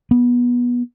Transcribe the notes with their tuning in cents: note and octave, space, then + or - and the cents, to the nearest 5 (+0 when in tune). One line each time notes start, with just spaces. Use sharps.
B3 -20